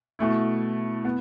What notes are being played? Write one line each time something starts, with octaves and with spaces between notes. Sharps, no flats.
B2 A3 E4
B3